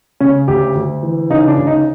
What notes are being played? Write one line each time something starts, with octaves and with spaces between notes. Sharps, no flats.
C#3 C#4
D2 G4
D2
E3
C#3 D#4
D4
D2
D#4